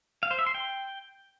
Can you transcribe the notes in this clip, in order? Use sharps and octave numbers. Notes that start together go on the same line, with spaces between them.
F5
C5
E5
C6
G5